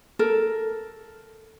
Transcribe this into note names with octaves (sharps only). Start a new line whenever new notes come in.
A4 A#4